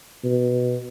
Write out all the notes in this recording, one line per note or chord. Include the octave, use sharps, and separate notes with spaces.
B2